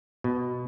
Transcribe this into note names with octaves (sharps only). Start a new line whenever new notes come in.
B2